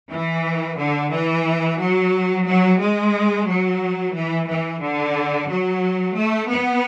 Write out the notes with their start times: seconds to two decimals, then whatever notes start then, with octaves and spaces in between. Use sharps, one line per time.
0.11 E3
0.77 D3
1.11 E3
1.78 F#3
2.46 F#3
2.79 G#3
3.46 F#3
4.14 E3
4.47 E3
4.81 D3
5.48 F#3
6.15 A3
6.48 B3